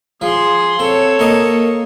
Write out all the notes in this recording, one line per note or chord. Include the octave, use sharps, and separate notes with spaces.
F3 G#4 C6
C4 A4 C#5
A#3 D#5